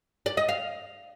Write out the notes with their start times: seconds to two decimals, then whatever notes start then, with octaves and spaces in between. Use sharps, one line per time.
0.26 D5
0.37 D#5
0.49 F5